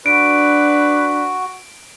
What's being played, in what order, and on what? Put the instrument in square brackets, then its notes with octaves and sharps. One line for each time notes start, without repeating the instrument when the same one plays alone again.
[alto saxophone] D4 [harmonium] F#4 [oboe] B4 [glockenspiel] D7